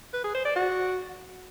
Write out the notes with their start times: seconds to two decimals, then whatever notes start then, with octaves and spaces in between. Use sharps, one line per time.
0.14 B4
0.24 G#4
0.35 C5
0.45 D5
0.56 F#4